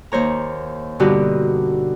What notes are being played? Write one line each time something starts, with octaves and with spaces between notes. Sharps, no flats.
D#2 C5 C#5 A#5
G2 B2 D3 D#4 F#4 G4